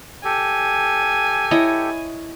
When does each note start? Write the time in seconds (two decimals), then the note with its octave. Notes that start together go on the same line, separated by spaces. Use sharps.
0.24 G4 A4 G#5
1.51 E4 C#5 D#5